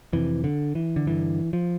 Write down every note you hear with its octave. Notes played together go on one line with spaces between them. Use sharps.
F2 C3 E3
D3
E3
D3
G2 D3 E3
F3